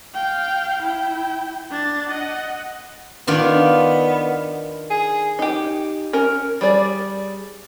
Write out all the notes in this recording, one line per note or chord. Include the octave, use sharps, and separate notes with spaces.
F5 G5
E4 G5
D4 A6
D#5 F#5
D#3 B3 D4 F4
G#4
D#4 G4
C#4 A#4
G3 G#4 D5